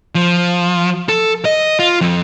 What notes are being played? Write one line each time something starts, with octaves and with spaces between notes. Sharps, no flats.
F3
A4
D#5
F4
F2